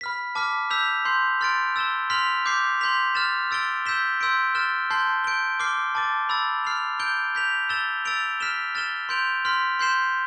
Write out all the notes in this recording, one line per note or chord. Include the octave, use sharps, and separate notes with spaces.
B5 F6 B6
A5 D6 F6 B6
E6 G6 B6 F7
C6 G6 C7
C6 F6 A6 D7
E6 A6 E7 G7
C6 F6 B6 F7
D6 G6 C7
C6 G6 B6 F7
F6 A6 E7
E6 A6 D7 G7
E6 G6 B6 E7 G7
C6 E6 G6 B6 D7
F6 A6 E7 G7
A5 C6 G6 C7 G7
G6 D7 G7
D6 F6 C7 G7
A5 D6 A6
B5 E6 A6
F6 C7 F7
G6 D7 G7
G6 B6 F7
E6 A6 E7 G7
E6 A6 D7 F7
F6 B6 E7 G7
F6 A6 E7 G7
C6 G6 D7 F7
C6 F6 B6
C6 G6 C7 E7 G7